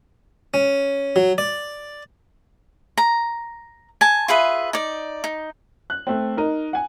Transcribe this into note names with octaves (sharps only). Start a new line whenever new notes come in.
C#4
F#3
D5
A#5
G#5 A5
F4 G#4 B4 E5
D#4 D5
D#4
F#6
A3 C4
D#4 A#4
F#5 G#5